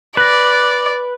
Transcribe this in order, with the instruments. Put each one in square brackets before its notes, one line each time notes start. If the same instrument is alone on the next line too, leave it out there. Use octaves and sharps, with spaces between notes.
[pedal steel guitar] B4 [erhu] D5 [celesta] F#6 A#6